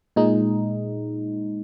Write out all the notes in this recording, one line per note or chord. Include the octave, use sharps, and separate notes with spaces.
A#2 G#3 D#4